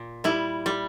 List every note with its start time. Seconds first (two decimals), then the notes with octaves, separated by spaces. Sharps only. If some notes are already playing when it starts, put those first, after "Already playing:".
Already playing: A#2
0.24 G3 E4
0.66 G3